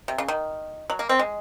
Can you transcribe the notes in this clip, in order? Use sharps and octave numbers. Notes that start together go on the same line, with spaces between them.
C3
C#3
D#3
F#3
A#3
C4
G#3